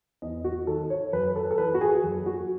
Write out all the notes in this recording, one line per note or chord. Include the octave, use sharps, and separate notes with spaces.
E2 D#5
F#4
D#3 A4
C#5
F#2 B4
A4
A4
E3 B4
F#4
G#4
F#2
F#4